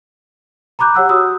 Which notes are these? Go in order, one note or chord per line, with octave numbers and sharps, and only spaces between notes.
A#5 B5 D6 F#6 G6
G4 C#5 F#5 E6 F#6
F#4 D#6 E6